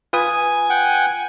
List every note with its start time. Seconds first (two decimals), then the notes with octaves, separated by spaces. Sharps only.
0.13 F4 B4 G#5 D#6
0.70 F#5 G5